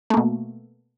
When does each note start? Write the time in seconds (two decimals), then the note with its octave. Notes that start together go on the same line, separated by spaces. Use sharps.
0.10 A3
0.14 A#3
0.17 B2